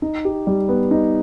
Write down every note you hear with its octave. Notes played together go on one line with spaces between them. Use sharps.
D#4
G4
G3
B3
D#4